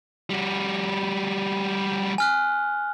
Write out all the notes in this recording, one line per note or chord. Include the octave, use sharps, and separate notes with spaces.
G3 F#4
G#5 F6 F#6